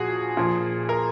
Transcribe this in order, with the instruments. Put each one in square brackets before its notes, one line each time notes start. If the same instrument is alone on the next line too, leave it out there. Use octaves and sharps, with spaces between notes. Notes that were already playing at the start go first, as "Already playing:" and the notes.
Already playing: [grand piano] A#2 F3 F#4 G#4
A#2 F3
A#4